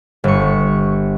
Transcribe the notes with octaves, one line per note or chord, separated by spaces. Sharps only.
G1 C#6